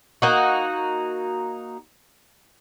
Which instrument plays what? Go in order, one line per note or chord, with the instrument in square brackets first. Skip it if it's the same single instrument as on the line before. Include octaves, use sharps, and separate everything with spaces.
[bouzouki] A#3 D#4 F#4